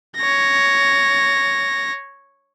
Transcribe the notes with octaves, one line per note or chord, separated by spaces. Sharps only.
C#5 A#6